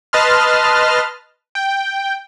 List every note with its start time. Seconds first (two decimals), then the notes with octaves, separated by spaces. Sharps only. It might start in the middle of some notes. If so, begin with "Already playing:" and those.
0.13 B4 D#5 A5 C6 F6
1.55 G5